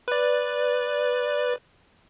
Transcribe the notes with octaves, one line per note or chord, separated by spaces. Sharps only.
B4 D5